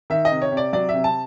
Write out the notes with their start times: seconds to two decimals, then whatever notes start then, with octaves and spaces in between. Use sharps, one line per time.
0.10 D#3 E5
0.25 D#5
0.31 C3
0.42 C#5
0.52 C3
0.57 D5
0.73 F#3 D5
0.89 E5
0.94 C3
1.04 A5